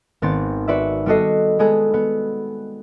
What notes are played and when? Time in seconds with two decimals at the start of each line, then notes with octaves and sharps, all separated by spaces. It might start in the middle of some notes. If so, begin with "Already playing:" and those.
0.22 G#1 B3 C4 A6
0.68 F#4 B4 D5 E5
1.06 G3 B3 F#4 A4 D#5 C7
1.59 G#3 B3 G#4 A4
1.94 B3